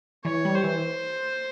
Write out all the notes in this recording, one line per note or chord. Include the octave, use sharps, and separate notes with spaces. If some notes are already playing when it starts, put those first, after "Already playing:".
E3 C#5
G3
C5
E3